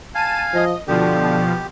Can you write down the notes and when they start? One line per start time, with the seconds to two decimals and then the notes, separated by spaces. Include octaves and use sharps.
0.15 F5 G#5 A5 D#7
0.54 F3 D#5
0.88 B2 D3 F3 G4